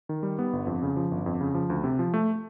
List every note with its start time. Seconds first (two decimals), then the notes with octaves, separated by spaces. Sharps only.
0.09 D#3
0.23 G3
0.39 B3
0.53 G1
0.67 F2
0.82 C#3
0.96 F3
1.11 G1
1.26 F2
1.41 C#3
1.54 F3
1.70 D2
1.84 C3
1.99 F3
2.14 A3